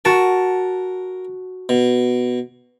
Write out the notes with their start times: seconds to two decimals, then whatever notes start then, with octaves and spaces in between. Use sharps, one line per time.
0.05 F#4 A#4 A5
1.69 B2